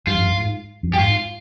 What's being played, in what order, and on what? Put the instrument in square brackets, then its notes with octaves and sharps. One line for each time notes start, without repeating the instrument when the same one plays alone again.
[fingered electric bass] G2 [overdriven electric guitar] F4
[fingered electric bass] F2
G2
G#2
F2
[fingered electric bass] G2 [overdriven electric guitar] G4
[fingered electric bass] G#2 [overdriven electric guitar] F4